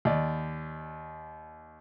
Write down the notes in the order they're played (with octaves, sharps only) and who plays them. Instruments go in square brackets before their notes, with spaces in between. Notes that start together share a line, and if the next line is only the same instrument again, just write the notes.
[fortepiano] D#2 D5